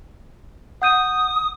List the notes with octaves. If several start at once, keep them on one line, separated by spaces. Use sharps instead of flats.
F#5 D#6 G6 D#7